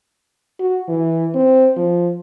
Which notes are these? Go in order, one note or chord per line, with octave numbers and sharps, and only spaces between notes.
F#4
E3
C4
F3